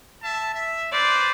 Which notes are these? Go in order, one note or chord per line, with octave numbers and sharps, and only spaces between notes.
E5 A5
E5
B4 C5 D5